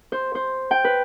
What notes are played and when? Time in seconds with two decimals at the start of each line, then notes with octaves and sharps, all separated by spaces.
0.12 C5
0.35 C5
0.71 G5
0.84 B4